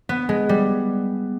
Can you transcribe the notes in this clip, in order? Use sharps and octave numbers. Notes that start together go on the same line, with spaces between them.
B3
G#3
G3